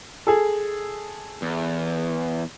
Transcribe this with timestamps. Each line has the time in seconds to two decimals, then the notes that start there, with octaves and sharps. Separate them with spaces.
0.27 G#4 A4
1.42 E2